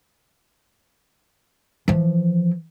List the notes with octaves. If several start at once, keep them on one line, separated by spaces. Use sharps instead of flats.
E3 F3